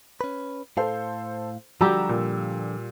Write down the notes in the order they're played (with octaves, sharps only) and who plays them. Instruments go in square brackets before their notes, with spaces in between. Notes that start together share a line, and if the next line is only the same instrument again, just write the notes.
[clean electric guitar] C#4 B4
[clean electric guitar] A2 F5 [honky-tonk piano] A4 C5
[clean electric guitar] D3 F3 [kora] G3 G4 [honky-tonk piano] F#4 A#5 E6
[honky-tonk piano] A#2